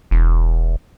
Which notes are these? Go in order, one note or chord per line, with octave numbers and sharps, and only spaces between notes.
E1